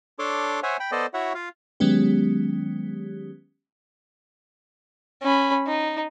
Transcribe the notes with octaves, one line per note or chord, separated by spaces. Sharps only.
D4 A4 C#5 C6 D6
C5 C#5 E5 F#5 G#5
G5 B5
B3 A4 C5 D5 D#5
E4 F#4 C#5 E5 F#5
F4 F5
D#3 F#3 G#3 B3 C#4 G4
C#4 B5
D#4